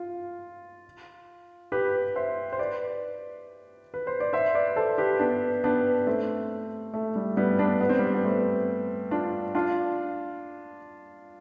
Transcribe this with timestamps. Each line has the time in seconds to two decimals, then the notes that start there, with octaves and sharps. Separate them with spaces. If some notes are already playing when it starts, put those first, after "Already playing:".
Already playing: F4
1.72 G4 B4
2.16 C5 E5
2.53 C5
2.59 B4 D5
3.94 B4
4.07 C5
4.20 D5
4.33 C5 E5
4.55 B4 D5
4.76 A4 C5
4.98 G4 B4
5.19 B3 D4
5.64 B3 D4
6.07 A3 C4
6.94 A3
7.16 G3
7.37 G3 B3
7.59 B3 D4
7.80 B3
7.89 C4
7.99 G3 B3
8.15 B3
8.24 A3 C4
9.11 D4 F4
9.55 D4 F4